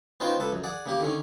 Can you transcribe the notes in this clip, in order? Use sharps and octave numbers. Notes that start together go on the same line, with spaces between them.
B3 C#4 D#4 F4 C5 G5
C#2 A4 B4 A5
F#2
G#4 D5 F#5
C#3 A#3 G4
D3 D#3 C#4